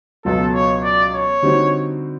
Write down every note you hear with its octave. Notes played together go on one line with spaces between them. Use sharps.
C#2 B2 F#3 A4
C#5
D5
C#5
D3 G3 C4 D#4 F#4